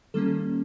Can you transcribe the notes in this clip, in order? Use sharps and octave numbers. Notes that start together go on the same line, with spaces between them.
D#3 G3 A#3 C#4 A4